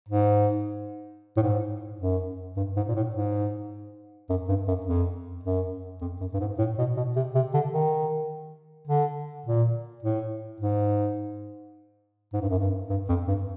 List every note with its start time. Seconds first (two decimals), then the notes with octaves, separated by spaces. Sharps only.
0.09 G#2
1.37 A2
1.43 G#2
2.01 F#2
2.57 G2
2.76 G#2
2.88 A#2
2.96 A2
3.14 G#2
4.30 F#2
4.49 G2
4.68 F#2
4.86 F2
5.44 F#2
6.01 F2
6.21 F#2
6.34 G2
6.40 G#2
6.59 A2
6.79 B2
6.97 B2
7.16 C3
7.35 C3
7.54 D3
7.73 D#3
8.88 D3
9.46 A#2
10.03 A2
10.61 G#2
12.33 G#2
12.41 G2
12.50 F#2
12.59 G2
12.90 G2
13.09 F2
13.28 G2